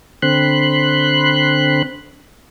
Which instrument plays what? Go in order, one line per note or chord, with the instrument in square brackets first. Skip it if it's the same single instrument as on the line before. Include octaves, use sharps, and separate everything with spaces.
[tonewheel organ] D3 C4 B5 C6 F#6